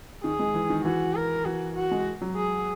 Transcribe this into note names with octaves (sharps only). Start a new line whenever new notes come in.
D#3 G#4
G#3
E3
D#3
E3 F#4
A#4
E3 F#4
F#4
G#3
F#3
G#4